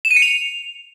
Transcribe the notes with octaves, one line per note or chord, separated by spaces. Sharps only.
E7
D#7
C#7
F7